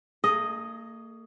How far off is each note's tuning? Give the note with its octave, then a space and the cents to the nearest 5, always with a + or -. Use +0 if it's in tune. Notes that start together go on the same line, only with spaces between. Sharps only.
A#3 -40 G#4 +30 D#5 +0